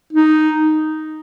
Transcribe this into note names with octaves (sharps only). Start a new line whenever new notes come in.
D#4